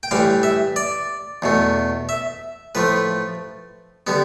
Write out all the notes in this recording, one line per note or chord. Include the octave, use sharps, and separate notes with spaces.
G5
A2 E3 G3 F5
E5
D5
E2 B2 A3
E5
A2 F3 A3 B4
D3 G3 B3